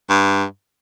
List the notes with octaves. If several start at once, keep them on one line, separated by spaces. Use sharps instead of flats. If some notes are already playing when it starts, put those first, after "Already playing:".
G2